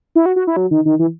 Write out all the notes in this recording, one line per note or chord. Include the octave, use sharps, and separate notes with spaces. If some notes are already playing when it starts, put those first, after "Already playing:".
E4
F#4
F#4
E4
F#3
D#3
D#3
E3